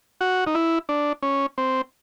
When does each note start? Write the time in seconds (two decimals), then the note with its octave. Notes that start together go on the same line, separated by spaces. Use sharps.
0.21 F#4
0.47 D#4
0.55 E4
0.89 D4
1.22 C#4
1.58 C4